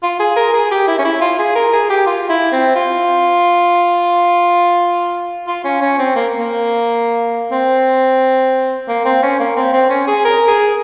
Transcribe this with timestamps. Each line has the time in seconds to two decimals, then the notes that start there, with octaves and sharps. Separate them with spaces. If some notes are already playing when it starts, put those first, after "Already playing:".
0.03 F4
0.20 G#4
0.36 A#4
0.54 G#4
0.71 G4
0.88 E4
0.99 C#4
1.05 E4
1.21 F4
1.39 G#4
1.55 A#4
1.73 G#4
1.90 G4
2.07 F4
2.30 E4
2.52 C4
2.76 F4
5.47 F4
5.65 C#4
5.81 C#4
5.98 C4
6.16 A#3
6.38 A#3
7.51 C4
8.88 A#3
9.05 C4
9.23 C#4
9.39 A#3
9.57 C4
9.73 C4
9.90 C#4
10.07 G#4
10.25 A#4
10.47 G#4